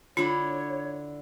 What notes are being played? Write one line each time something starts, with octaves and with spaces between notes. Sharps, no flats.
D3 E4 F4 C#5